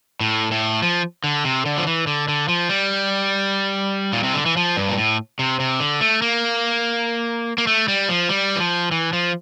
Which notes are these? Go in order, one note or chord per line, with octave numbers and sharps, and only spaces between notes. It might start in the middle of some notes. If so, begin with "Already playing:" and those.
A2
A2
F3
D3
C3
D3
F3
E3
D3
D3
F3
G3
A#2
C3
D3
E3
F3
G2
A#2
A2
C3
C3
D3
A3
A#3
A#3
A3
G3
F3
G3
E3
F3
E3
F3